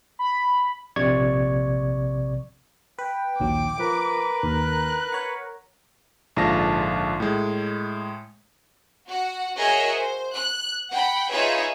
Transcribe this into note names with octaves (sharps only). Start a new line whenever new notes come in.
B5
A#1 C3 D5 C#6 G#6
B4 G5
A#1 D#2 F#3 D6
F3 A#4 B4
D#2 F#6
C#5 F#5
A#1 G#2 D3 F4 A5 A#6
A2 G#3
F#4 F#5
F#4 G#4 A#4 C#5 D#5 E5
C5
F#6
F#5 G5 B5
D#4 F4 G#4 B4 C#5 E5